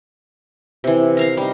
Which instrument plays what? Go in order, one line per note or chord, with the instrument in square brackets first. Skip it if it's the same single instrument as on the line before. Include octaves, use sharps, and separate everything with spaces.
[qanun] C3 E3
A#4 F5 A#5
G3 D#4